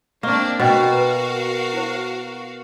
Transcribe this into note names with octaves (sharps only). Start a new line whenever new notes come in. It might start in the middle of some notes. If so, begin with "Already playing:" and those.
A#3 C4 D4 D#5 C#6
B2 F#4 A#4 C5 D#5 F5 G5
B4 A#5
E4 C5